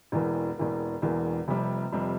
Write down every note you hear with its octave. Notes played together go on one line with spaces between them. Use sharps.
E1 E2 E3 A#3
E1 E2 E3 A#3
E1 E2 E3 A#3
F1 F2 C3 G3
F1 F2 C3 G3